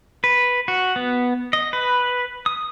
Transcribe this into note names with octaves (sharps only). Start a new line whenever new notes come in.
B4
F#4
B3
D#5
B4
D#6